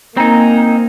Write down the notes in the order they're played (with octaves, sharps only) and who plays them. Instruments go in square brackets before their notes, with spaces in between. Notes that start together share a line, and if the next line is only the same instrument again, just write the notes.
[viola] A#3 [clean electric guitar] C4 D#4 [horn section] G#5 A#5